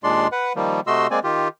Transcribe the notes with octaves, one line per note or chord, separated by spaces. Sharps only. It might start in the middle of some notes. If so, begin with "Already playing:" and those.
D#2 A#2 G#3 D4 D5 C6
B4 F#5
D#3 F3 G3 A#3
C3 A3 F#4 D#5 C6 E6
G#3 A#3 C4 D5 G#5
D#3 F4 G4